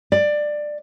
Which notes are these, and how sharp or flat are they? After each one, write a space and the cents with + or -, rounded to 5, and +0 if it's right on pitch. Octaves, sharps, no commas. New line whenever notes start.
D5 +15